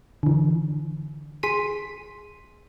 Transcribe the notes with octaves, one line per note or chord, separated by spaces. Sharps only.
D3 E3
G#4 C6 B6 D#7